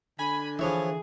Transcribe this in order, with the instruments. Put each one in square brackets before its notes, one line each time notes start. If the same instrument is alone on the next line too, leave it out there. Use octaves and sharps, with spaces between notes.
[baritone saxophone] D3 [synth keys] G#5 [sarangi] B5
[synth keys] E3 [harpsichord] F3 C#5 E5 [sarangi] G#4